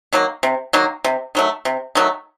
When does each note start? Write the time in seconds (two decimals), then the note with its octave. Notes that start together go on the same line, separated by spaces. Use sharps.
0.13 D#3 F#3 A#3
0.43 C3
0.73 D#3 F#3 A#3
1.04 C3
1.35 D#3 F#3 A3
1.65 C3
1.95 D#3 F#3 A3